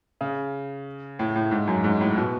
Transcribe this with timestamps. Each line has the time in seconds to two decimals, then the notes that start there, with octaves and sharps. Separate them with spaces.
0.21 C#3
1.19 A2
1.36 A2
1.51 G#2
1.67 F#2
1.84 G#2
2.01 A2
2.17 B2